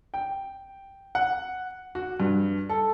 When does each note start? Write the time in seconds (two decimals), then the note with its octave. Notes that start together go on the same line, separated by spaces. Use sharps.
0.14 G5
1.15 F#5
1.95 F#4
2.20 G2
2.69 A4